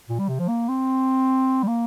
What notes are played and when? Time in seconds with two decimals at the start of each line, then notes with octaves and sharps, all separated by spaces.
0.09 A#2
0.19 G3
0.29 C3
0.39 F3
0.48 A#3
0.69 C4
1.63 G3
1.67 A#3